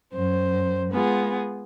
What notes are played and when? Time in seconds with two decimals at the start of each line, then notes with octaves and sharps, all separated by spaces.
0.13 F#2 C5
0.91 G#3 B3 F4 G#4